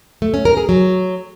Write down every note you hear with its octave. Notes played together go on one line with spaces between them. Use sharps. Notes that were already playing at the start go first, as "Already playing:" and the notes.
A3
C#4
A#4
G#4
F#3